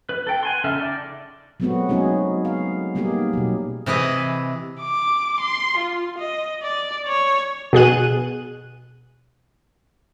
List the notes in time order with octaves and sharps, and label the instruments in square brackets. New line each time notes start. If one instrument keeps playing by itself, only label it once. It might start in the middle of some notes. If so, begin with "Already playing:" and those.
[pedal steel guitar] B4
A4 G5
F#5 G#5 C6
C#3 A4 E5 A5 F6
D#4 D5
[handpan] F#3 G#3 A3 B3 C4 F#4
F#3 G#3 B3 C#4 D#4 G#4
F5
G3 A#3 B3 D#4 G4 G#4
B2 F#3
[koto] C3 E3 G#4 B4 D#5
[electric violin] D6
C6
F4
D#5
D5
C#5
[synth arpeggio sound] B2 G#4 F#6 D#7